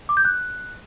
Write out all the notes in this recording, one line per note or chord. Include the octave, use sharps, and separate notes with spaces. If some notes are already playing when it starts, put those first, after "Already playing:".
D6
G6
F#6